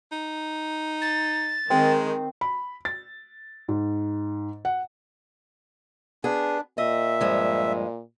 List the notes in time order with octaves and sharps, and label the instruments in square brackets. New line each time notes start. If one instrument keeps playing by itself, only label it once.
[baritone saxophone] D#4
[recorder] A6
[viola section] D#3 [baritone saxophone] G#3 [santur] C4
[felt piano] B5
A6
G#2
F#5
[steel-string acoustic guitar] B3 G#4 [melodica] D4
[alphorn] A#2 [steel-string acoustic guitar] D#5 [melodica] E5
[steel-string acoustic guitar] G2 F3 G#3